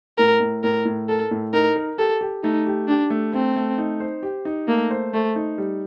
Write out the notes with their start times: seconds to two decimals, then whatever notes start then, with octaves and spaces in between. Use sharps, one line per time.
0.18 A2 A#4
0.40 A2
0.64 A2 A#4
0.85 A2
1.08 A4 A#4
1.31 A2
1.53 D#4 A#4
1.76 A#4
1.98 G4 A4
2.21 G4
2.43 A3 D#4
2.66 G4
2.88 D4 G4
3.10 A3
3.33 A3 C4
3.56 A3
3.78 D#4
4.00 C5
4.23 G4
4.45 D#4
4.68 A3 A#3
4.91 C5
5.14 A3 C5
5.36 D#4
5.58 G3